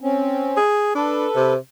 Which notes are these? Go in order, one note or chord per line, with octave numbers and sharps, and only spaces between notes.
C4 C#4
G#4
D4 A4 B4
C3